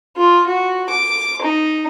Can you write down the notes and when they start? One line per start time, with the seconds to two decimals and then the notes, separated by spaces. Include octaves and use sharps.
0.17 F4
0.47 F#4
0.89 D6
1.42 D#4